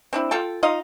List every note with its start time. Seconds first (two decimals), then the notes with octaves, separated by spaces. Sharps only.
0.13 C4 D4 E4
0.31 F4 A4 G5 A5
0.63 D#4 F4 D#5 F5